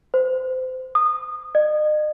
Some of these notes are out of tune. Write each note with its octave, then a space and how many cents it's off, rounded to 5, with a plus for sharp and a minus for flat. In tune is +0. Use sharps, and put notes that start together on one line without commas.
C5 -25
D#6 -25
D#5 -40